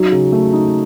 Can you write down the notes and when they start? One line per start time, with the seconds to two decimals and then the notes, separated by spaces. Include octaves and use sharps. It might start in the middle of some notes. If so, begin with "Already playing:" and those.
Already playing: F#3 D#4
0.12 C#3
0.33 A3
0.53 D#4